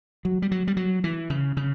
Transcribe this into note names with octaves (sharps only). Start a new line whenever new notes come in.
F#3
G3
F#3
G3
F#3
E3
C#3
C#3